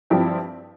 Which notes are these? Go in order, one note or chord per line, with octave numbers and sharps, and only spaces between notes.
G2 F3 C4 E4 G4